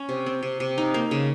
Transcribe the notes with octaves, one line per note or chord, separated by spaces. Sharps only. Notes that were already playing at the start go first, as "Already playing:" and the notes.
Already playing: C#4
C3
C4
C3
C3
D#4
A#3
C#3